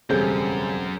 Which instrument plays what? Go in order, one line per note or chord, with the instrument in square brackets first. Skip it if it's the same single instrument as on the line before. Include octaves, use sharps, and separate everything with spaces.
[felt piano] E1 C4 G6 [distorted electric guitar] F#2 [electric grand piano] C#3 G3 [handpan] G#4 A4